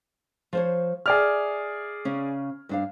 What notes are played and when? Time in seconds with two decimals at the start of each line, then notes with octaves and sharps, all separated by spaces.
0.53 F3 C5 C#5
1.06 G#4 D5 E5 F6
2.05 C#3 C#4
2.69 G2 D4 F5